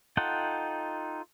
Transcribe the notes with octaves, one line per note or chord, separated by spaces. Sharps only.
D#4 F4 A4 F#5 G5